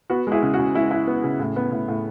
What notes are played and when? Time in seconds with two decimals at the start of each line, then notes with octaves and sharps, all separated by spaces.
0.10 B3 F#4
0.27 G#3 E4 G#4
0.43 C#3
0.54 F#4
0.59 C#3
0.75 G#3 E4
0.91 E4
1.07 B3
1.24 C#3
1.40 A2
1.56 B3
1.72 A2
1.88 A2